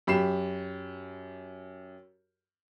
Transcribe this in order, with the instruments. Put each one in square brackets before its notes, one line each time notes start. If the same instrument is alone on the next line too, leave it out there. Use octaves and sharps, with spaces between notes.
[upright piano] F#2 G4 B5 C7 E7